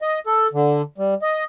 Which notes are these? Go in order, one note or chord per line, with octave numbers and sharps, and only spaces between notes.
D#5
A4
D3
G3
D#5